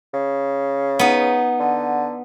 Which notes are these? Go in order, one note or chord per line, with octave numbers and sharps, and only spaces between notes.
C#3
B3 D#4
D3